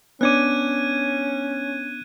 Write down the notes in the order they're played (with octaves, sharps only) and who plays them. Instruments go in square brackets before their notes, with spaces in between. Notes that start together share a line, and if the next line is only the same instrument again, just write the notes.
[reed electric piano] B3 D4 D6 [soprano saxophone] C#4 [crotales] F#6 G#6 D#7